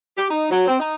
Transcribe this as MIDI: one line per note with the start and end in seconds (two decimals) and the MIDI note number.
0.17 0.26 67
0.30 0.48 63
0.51 0.66 54
0.67 0.75 60
0.80 0.95 63